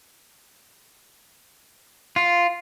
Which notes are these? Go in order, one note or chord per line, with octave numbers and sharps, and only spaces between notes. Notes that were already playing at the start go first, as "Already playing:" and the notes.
F4